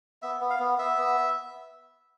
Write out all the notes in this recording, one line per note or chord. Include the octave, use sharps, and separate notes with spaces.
B3 E5
B3
F5
B3
B3 E5
B3